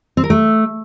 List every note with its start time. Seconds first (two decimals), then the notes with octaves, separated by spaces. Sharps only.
0.17 C4
0.24 A#4
0.30 A3